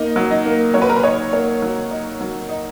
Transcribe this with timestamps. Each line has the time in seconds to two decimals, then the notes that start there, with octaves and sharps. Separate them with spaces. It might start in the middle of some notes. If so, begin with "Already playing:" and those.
Already playing: A#3 D#4
0.16 F#3
0.31 D#4
0.45 A#3
0.74 F#3 C#5
0.82 B4
0.89 A#4
0.96 B4
1.03 D#4 C#5
1.33 A#3 C#5
1.62 F#3
1.91 D#4
2.21 F#3
2.49 D#4